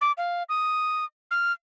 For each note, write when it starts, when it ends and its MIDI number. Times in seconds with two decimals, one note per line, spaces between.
0.01 0.12 86
0.17 0.43 77
0.49 1.05 87
1.31 1.52 89